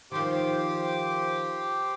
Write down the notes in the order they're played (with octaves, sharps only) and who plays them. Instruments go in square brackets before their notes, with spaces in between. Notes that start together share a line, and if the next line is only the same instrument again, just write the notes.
[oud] D#3 F3 [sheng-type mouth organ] G4 C5 D6